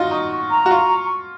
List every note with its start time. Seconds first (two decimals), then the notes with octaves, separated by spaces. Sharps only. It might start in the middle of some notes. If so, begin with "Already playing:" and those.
Already playing: D#4 F4 F#4
0.11 D#4 C#6
0.32 C#6
0.51 A#5
0.66 F#4
0.70 F4 C#6